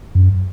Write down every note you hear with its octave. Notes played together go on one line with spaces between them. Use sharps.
F#2